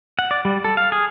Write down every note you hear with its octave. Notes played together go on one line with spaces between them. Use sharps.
F#5
D5
G3
A4
F5
G#4